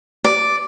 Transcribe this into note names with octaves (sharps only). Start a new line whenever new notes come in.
D5